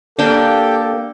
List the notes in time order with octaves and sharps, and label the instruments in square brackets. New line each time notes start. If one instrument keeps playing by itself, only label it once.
[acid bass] A#3 [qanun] D4 G5 [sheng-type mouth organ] G4 [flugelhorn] A4